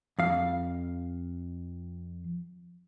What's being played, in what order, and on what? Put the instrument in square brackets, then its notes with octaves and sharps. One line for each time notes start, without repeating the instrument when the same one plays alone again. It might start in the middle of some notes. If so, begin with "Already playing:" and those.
[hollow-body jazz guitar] F2 F5